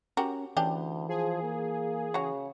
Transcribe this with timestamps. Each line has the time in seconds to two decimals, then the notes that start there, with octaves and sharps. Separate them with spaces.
0.17 C#4 F#4 G4 A#4
0.57 D2 E3 C#4 D4 G4
1.08 F3 G#4
1.42 A#3
2.14 C#3 F#4 C#5